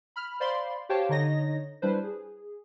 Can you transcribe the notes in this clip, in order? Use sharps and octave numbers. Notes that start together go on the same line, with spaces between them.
B5 F6
C5 D5 F5 B5 C6
G4 C5 C#5 F5 G5 A5
D3 D#4 C#5 D#5 A#6
G3 D4 E4 B4 C5
G#4